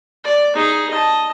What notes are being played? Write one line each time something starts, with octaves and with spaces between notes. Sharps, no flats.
D5
D#4 G#4
D#5 A5